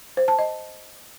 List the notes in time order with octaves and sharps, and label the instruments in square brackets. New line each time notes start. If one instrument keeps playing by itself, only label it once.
[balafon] C5
A5
D#5